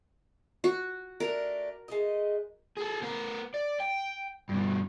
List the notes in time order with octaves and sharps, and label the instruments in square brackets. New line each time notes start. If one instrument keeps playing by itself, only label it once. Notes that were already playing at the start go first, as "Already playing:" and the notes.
[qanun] F#4
[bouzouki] A3 D4 [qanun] A#4
[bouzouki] G#3 A3 D#5
[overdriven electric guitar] G#4 A4
B3 A#4
D5
G5
G2 B2